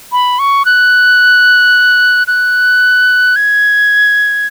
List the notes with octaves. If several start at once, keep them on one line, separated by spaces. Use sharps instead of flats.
B5
C#6
F#6
F#6
G#6